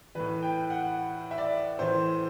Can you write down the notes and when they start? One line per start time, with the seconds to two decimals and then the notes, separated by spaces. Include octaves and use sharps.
0.15 A2 E3 B4
0.42 G5
0.70 F#5
1.31 E5
1.38 D5
1.79 A2 E3 C5